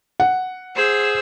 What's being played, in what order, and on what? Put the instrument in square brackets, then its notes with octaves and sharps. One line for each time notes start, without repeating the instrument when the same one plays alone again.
[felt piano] F#5
[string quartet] G#4 C5 E6